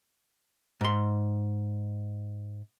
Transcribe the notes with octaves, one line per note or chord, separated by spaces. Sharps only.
G#2 C6